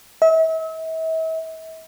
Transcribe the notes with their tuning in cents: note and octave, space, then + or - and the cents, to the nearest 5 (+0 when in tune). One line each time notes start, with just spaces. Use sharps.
E5 -40